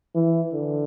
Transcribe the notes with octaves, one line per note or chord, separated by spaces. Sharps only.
E3
D3